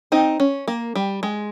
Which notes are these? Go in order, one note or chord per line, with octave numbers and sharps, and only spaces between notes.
C4 D#4
C#4
A#3
G3
G#3